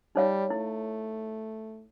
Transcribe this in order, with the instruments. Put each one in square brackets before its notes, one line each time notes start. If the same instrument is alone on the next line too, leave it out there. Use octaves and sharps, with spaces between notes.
[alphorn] G3 [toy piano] D#4 C#5 F5
[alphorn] A3 [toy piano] E4